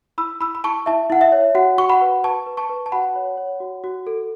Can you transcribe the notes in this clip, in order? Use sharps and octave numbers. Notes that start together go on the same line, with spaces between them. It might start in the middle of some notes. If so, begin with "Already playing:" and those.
E4 B5 E6
E4 B5 E6
B5
E4 A5 C#6
E4 E5 A5
E4 F#5
E5
C#5
F#4 F#5
F#4 C#6
F#5 B5
B4
B4 A5 C#6
B4
A5 C#6
B4
A5
F#4 F#5 B5
C#5
C#5
F#4
F#4
A4